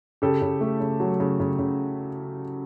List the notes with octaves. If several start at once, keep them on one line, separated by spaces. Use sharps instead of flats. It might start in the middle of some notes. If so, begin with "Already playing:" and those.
C#3 G4 A4
C#3
A3
C#3
F#3
C#3
C#3
C#3